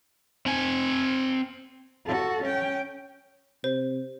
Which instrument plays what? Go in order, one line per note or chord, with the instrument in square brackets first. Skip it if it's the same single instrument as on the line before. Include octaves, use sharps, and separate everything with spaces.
[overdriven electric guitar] C4 G#5
[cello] F#4 A4
C#4 G5
[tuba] C3 [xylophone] C5